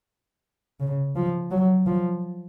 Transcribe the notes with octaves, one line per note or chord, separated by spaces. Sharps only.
C#3
F3
F#3
F3